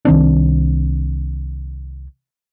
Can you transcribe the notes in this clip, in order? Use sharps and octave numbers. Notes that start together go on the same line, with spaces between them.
C2 D#3 C4 D4